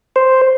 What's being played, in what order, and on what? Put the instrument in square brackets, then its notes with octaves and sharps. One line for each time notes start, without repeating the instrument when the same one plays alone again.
[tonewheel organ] C5